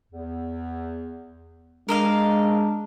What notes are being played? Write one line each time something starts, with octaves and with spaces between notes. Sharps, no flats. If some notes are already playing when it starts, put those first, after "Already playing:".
E2
G#3 D4 A#4 D#5 F5